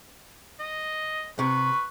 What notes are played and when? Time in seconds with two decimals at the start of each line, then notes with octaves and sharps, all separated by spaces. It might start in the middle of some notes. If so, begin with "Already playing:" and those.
0.60 D#5
1.39 C3 B4 C#6